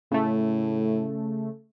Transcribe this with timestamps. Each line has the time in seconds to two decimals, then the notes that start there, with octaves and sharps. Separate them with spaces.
0.12 A2 C#3 A3